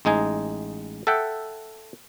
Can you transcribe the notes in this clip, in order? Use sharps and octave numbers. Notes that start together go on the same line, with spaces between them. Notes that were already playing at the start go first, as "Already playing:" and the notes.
A1 G#3 D#4 G#5
A4 E5 F#5 G5